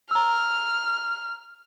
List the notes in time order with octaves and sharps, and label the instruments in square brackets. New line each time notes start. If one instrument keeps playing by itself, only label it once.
[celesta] A#5 E6 [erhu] F6